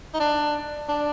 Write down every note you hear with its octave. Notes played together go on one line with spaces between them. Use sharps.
D#4
D4
D4